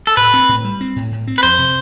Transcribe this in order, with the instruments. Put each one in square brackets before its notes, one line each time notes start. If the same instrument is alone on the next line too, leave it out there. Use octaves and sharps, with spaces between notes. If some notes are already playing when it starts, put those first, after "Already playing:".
[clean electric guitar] A4
[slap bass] A2 [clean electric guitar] B4
[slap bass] C4
A2
G3
C4
A2
A2
C4
[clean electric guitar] B4
[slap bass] F2 [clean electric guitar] C5
[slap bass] C3